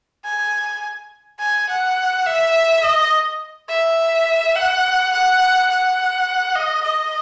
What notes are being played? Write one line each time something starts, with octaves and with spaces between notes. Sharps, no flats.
G#5
G#5
F#5
E5
D#5
E5
F#5
F#5
F#5
D#5
D#5